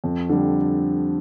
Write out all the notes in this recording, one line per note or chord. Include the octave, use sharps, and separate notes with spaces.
F2
D3 G3